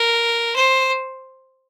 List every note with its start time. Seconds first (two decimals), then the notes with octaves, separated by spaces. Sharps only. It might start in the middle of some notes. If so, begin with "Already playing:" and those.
Already playing: A#4
0.56 C5